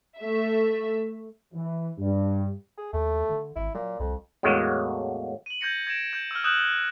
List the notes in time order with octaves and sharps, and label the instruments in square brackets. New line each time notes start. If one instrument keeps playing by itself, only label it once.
[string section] A3 E5
[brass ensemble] E3
G2
[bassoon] G#4
[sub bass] D#2 [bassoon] A3
[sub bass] D3
[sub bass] G#1 [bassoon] E4
[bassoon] A#2 [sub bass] F#3
[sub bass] C2 [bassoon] F2
[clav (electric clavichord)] E2 A2 F#3 G#3 A#3
[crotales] D#7 F#7
G6 G#6 A#6 C#7
G#6 A#6 D7 E7
G6
E6 F6
D#6 E6 F#6 G6 E7 F#7